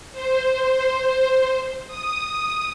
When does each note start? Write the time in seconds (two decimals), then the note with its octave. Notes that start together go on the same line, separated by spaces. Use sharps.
0.12 C5
1.87 D#6